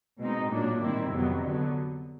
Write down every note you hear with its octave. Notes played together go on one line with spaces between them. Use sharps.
B2 G#3 C4 D#4
A#2 F#3 A#3 D4
G#2 D#3 G3 C4 E4
F2 C3 D#3 F#3 B3
D3 F#3 B3